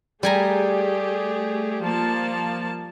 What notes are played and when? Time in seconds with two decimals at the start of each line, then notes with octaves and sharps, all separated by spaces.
0.23 G3 A3 G4 G#4 G#5 A#5
1.83 F3 A#3 A5